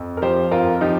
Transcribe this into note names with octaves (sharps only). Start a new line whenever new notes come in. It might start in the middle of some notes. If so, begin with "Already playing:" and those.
Already playing: F2
A#4
F3 G4 C5
F2 F4 A#4
F3 D#4 G4